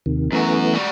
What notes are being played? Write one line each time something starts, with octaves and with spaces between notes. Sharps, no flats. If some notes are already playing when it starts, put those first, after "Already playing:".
D#2 C3 D#3
F#2 E3 A3 B3 F#4
G3 F#4